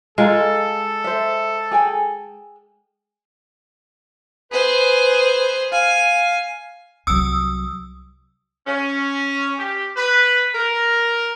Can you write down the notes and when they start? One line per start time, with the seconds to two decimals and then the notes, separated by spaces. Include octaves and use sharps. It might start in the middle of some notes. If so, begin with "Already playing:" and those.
0.18 G#3 F4 A4 F5 A#5
1.04 C5 E5
1.71 G#4 G5 G#5
4.52 G#4 B4 C5
5.72 F5 G#5
7.07 C2 F#3 D#6 E6
8.67 C#4
9.58 G4
9.97 B4
10.54 A#4